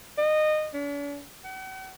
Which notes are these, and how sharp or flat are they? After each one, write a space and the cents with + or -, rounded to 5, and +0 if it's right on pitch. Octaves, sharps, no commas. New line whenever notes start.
D#5 -20
D4 -45
F#5 +45